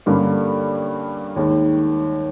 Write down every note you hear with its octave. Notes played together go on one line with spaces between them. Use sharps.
G2 D3 G3 A#3 C#4
D#2 D#3 G#3